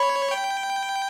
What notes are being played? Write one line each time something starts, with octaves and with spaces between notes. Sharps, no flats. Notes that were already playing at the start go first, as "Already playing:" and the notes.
Already playing: C#5 B5
G5